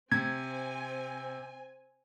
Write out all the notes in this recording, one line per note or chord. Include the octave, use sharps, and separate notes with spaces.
C3 C4 G#5 G#6